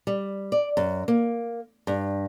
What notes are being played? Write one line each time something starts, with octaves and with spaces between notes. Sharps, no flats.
G3
D5
F#2
A#3
G2